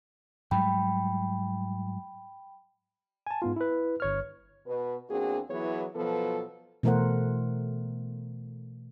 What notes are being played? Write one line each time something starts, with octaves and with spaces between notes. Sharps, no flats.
G#2 F#3 G3 G5 B5
G#5 A5
G#2 B3 F4
E4 B4
G1 C#5 F6
B2 B4
E2 A#3 C4 D4 F#4 G#4
E3 F#3 B3 E4 G#4 C#5
B2 F3 F#3 B3 A4 B4
B2 E3 A3 A#4 C5 F#5